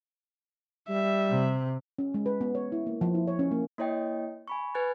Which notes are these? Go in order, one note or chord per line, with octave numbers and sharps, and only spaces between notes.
G3 E5
C3
C#4
G#3
B4
B3
C#5
E4
A#3
F3
E4
C#5
C#4
A#3
A#3 E4 C#5 D#5 G5
G#5 B5 C#6
B4 G#5 F#6 G#6 A6